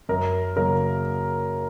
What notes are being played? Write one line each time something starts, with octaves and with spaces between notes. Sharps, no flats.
F#2 A#4
C#3 F#3 A#3 A#4